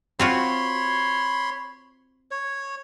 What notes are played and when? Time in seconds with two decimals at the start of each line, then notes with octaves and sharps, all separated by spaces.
0.19 C4 F4 F#4 C#5 B5 C6
2.31 C#5